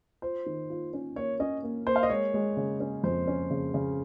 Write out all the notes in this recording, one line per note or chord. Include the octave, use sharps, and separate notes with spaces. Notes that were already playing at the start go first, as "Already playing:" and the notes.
F4 C5
D#3
F4
C#4
A#3 C#5
C#4 D#5
A#3
A#3 C5
F5
D#5
G#3 C#5
G#3
C#3
C#4
F2 C5
C#4
C#3
C#3